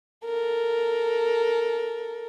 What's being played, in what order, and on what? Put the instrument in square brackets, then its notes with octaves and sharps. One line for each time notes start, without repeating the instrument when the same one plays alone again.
[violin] A4 A#4